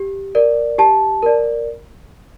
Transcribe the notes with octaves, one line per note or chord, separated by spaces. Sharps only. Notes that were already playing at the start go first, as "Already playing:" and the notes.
Already playing: G4
A#4 D5
G4 A5
A#4 D5